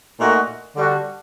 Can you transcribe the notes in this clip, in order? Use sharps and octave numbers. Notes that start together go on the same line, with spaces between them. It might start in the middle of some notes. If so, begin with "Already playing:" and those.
A#2 A3 D#4 F#4
D3 G3 D4 F#4